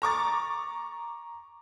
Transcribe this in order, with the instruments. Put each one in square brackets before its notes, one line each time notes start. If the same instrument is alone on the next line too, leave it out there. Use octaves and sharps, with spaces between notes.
[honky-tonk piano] A#5 C#6 D6 A6